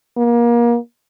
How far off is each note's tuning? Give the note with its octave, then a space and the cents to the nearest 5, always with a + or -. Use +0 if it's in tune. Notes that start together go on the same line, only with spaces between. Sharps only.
A#3 +30